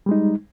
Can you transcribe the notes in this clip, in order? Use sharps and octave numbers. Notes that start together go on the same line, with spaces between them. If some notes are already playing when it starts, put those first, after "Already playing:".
G3 G#3 D#4